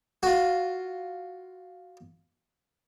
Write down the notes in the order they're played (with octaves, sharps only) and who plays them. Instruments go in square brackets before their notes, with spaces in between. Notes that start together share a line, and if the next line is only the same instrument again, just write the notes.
[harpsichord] F4 F#4